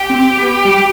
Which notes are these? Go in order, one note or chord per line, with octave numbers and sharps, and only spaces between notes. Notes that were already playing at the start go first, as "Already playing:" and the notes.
Already playing: G4
C4
B3
G3